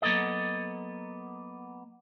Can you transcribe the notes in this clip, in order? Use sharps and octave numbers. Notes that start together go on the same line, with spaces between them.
F#3 A#3 B3 A4 D#5